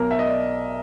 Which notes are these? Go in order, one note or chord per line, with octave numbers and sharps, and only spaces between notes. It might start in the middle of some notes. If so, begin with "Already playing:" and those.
Already playing: B1 B2 A#4
E5
D#5
D5